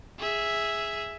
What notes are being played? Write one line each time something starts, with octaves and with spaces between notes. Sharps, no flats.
G#4 E5